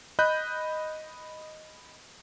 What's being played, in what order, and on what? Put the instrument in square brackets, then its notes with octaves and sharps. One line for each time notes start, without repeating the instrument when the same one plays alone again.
[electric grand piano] D#5 B5 F#6 G6